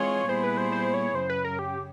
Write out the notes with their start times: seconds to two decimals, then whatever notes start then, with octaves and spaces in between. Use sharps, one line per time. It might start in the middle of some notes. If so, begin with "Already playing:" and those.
Already playing: E3 G#3 C4 F4 G#4 C#5
0.29 A#2 G3 B3 E4 G#4 C5
0.44 B4
0.57 C5
0.72 C5
0.94 C#5
1.15 F#2 C#3 F#3 C5
1.30 B4
1.45 A#4
1.59 G4